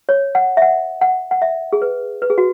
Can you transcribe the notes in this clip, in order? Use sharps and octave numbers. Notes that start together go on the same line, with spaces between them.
C#5
F#5
E5
F#5
F#5
F#5
E5
G#4
B4
B4
G#4
F#4